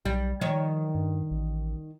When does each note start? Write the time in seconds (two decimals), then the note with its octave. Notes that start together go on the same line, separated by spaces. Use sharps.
0.05 B1 G3
0.41 D#3 F3 C#5
0.95 G2
1.31 A1